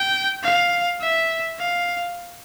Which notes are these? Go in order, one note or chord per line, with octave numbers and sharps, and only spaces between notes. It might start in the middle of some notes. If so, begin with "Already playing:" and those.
Already playing: G5
F5
E5
F5